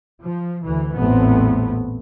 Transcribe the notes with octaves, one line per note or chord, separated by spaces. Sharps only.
F3
D2 E3
A1 E2 A#2 A3 B3 C4